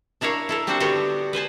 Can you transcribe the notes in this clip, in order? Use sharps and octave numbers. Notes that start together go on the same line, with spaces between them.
D4 E4 A#4 C#5 F5
E4 A4 A#4
G3 C4 D4 F#4 C5 F#5
D3 G3 B3 D4 F#4 G4
B4 C5 G#5 A5